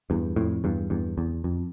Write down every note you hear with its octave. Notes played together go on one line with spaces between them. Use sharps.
E2 G2
F2 A2
E2 G2
E2 G2
E2
F2